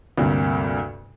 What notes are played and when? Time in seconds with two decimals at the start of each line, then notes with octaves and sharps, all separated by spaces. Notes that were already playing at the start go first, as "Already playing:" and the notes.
0.18 D2 G2 C3 A#3